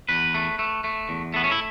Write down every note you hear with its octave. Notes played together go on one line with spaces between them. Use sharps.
E2 B4
A3
A3
A3
E2
A3 B3
C#4
E4